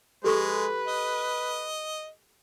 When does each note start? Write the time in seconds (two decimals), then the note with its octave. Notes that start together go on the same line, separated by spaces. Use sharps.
0.24 G#3 G4 A4 B4 C#6
0.87 D#5